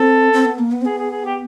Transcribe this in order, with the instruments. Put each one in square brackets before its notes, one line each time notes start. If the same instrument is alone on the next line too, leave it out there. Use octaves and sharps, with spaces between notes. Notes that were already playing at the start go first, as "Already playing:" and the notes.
Already playing: [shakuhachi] C4 [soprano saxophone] A4
[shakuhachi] C4
B3
A#3
B3
C4
[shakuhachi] B3 [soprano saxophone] G#4
[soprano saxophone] G#4
G#4
G4